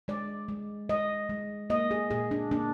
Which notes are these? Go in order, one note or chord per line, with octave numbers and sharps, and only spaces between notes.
G#3 D5
G#3
G#3 D#5
G#3
A#3 D#5
G#4
A#2 G#4
D4
A#3 D4